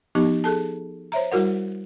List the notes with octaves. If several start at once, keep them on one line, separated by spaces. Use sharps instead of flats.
F3 B3 D#4 G4
G#4 A4 A5
C5 C#5 E5 A#5
G3 E4 F#4 A#4 F#5